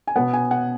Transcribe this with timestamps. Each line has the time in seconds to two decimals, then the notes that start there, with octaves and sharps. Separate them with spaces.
0.07 G#5
0.16 B2 B3 F#5
0.33 G#5
0.51 F#5